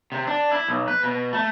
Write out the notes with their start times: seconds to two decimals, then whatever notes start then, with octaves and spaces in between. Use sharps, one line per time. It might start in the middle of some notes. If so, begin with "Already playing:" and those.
0.12 C3
0.27 D4
0.51 E4
0.68 B1
0.88 B4
1.03 B2
1.33 A3